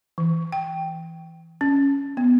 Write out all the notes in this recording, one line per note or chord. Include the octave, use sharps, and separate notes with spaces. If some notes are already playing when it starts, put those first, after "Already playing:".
E3
G5
C#4
B3